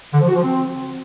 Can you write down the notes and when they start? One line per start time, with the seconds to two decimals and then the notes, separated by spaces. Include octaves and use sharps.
0.13 D3
0.21 F3
0.28 F#4
0.35 F3
0.43 C4